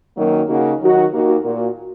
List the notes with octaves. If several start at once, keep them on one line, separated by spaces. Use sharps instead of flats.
F#2 D#3 F#3 A#3
C#3 A#3 D#4 F#4
D#3 F#3 D#4 F#4
D#2 D#3 A#3 F#4
A#2 A#3 F#4